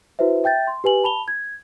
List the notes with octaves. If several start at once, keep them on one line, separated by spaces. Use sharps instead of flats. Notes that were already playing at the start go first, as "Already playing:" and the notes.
E4 F#4 B4 C5 E5
E5 G5 G6 A6
C6
G4 B4 G#5 F#7
A5 B5 F7 G7
G#6